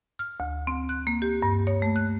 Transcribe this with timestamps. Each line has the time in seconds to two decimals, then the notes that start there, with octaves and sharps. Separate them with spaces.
0.19 F6
0.40 D2
0.67 C4
0.89 F#6
1.07 A#3
1.22 G4
1.42 G2
1.67 C#5
1.82 A3
1.96 F#6